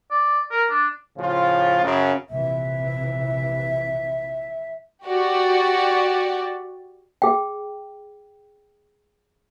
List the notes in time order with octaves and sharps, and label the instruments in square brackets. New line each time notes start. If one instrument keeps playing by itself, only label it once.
[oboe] D5
A#4
D4
[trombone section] A2 C#3 F3 F4
F#2 C#3
[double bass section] A#1 C3 E3 [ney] E5
[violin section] F#4 G4 D5
[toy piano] G#4 G5